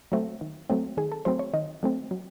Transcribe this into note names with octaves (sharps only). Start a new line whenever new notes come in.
F#3 A3 C4
D#3
F#3 A3 C4
D#3 G#4
A4
F#3 A3 C4 C5
C#5
D#3 D#5
F#3 A3 C4
F#3